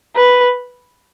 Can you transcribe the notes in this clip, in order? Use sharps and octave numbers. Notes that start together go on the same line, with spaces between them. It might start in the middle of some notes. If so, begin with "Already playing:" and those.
B4